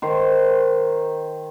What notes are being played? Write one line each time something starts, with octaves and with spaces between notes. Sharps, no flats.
D#3 C5